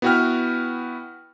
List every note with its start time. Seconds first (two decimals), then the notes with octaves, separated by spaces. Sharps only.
0.02 B3 E4 F#4 B4 G5 F6